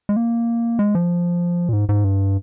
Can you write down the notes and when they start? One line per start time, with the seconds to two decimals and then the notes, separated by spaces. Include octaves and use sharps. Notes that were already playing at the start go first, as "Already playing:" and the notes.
0.09 G#3
0.16 A#3
0.79 G#3
0.95 F3
1.69 A#2
1.73 G#2
1.89 G#2
2.04 G2